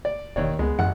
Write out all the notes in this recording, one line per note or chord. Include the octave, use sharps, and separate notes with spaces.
D5
E1 D#2 C#5 D5
C#2 G#3 B3
A1 F#2 F#5